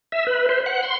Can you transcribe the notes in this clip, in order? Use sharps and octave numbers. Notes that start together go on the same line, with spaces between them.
E5
B4
C5
F#5
C6